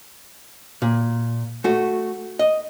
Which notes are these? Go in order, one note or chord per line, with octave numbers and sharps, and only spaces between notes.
A#2
A3 F#4
D#5